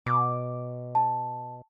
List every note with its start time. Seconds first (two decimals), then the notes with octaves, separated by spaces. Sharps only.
0.06 B2 D6
0.95 A5